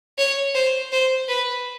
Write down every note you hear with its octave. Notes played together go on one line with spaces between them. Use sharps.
C#5
C5
C5
B4